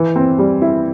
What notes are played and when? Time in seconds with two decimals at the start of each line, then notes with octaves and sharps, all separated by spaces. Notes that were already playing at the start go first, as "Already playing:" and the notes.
Already playing: E3
0.16 C4
0.39 G3
0.62 E4